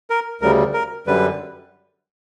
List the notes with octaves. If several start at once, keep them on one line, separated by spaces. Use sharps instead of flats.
A#4
D2 C#3 G3 A#4
A#4
F#2 D3 G3 B4